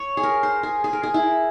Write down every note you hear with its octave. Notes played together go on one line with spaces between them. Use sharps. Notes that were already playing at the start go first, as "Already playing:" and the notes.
Already playing: F4 C#5
G#4
A#4
C5
G#4
G#4
A#4
G#4
E4